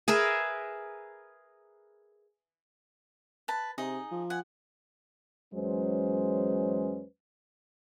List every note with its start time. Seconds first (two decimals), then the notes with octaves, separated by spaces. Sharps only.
0.08 G#4 A#4 B4 E5
3.48 B4 A5
3.78 C3 D#4 G#4 D#5
4.11 F3
4.30 F#5 G#5
5.54 E2 F#3 G#3 C#4 B4 C5